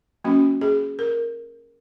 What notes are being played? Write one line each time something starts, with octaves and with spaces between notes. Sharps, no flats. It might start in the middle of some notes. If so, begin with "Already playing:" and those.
F#3 A#3 C#4 F#4
G#4
A#4